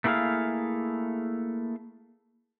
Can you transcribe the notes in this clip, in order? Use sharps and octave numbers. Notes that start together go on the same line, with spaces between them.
A3 A#3 E4 F#4 G#4 F5